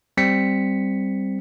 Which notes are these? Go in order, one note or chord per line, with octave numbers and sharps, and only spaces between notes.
G3 C4 B6 C#7